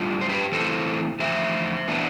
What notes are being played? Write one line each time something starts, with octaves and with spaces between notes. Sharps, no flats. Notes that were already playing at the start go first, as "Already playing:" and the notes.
Already playing: A2 G3 D4 F4
C5
G4 B4
E3 A3 C4 E4 A4 C5
E2 D3 F3 A3 C5 E5
E3 B3 D4